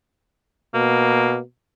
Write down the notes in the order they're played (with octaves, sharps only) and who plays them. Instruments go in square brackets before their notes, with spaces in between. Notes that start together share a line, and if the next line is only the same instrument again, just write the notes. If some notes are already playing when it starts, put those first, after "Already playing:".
[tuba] B2 [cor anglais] A#3